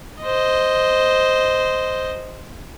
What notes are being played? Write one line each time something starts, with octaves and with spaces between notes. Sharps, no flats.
C5 D#5